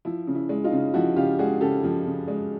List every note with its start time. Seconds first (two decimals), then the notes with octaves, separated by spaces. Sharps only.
0.05 F3 E4
0.27 C#3
0.35 E4
0.49 G#3
0.64 D#4 F4
0.72 C#3
0.94 F3 E4 F#4
1.16 C#3 F4 G4
1.39 G#3 F#4 G#4
1.61 C#3 G4 A4
1.83 F3
2.06 C#3
2.28 G#3